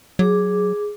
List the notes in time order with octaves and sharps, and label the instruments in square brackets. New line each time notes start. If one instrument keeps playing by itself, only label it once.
[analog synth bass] F#3 [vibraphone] G#4 D6